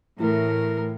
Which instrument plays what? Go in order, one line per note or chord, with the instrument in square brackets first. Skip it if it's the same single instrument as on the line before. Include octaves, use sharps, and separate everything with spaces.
[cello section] A2 [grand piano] E3 [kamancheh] A#4